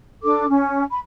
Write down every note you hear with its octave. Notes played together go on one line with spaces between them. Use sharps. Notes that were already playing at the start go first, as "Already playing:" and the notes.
D4 A4 D6
C#4
B5